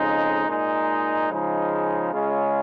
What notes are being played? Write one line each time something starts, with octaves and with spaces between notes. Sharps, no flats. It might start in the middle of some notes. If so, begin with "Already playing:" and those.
Already playing: F2 C#3 G#3 D#4
A#2 G#3 D#4
C#3 F3 G#3 D#4
C#3 G#3 C#4 F4